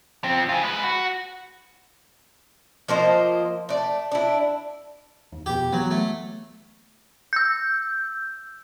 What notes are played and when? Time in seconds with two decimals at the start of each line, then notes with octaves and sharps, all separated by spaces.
0.24 F3 C4
0.49 F4 G#4
0.63 G#3 B4
0.84 F#4
2.88 F3 A#3 C5 D#5
3.69 A3 D5
4.12 D4 E4
5.32 D#2
5.46 F2 B2 G4
5.73 E3 F#3 B3
5.91 A3
7.33 E6 G6